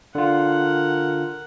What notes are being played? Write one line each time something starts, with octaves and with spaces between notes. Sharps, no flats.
D3 F4 A#4 F#5